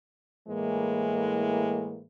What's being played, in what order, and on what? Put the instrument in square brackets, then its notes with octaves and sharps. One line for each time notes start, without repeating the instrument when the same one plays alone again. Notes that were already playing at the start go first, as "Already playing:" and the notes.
[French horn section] A2 E3 G#3 A#3